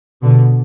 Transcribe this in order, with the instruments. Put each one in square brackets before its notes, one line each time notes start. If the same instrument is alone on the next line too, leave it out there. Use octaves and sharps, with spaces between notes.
[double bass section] B2 D3